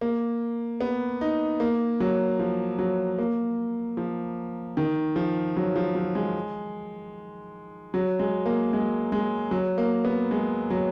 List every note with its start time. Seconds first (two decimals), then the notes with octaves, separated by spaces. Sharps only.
0.01 A#3
0.81 B3
1.21 D#4
1.60 A#3
2.00 F#3
2.39 F3
2.79 F#3
3.19 A#3
3.97 F3
4.77 D#3
5.16 F3
5.57 F#3
5.76 F3
5.95 F#3
6.15 G#3
7.94 F#3
8.19 G#3
8.46 A#3
8.73 G#3
9.12 G#3
9.51 F#3
9.78 A#3
10.05 B3
10.31 G#3
10.70 F#3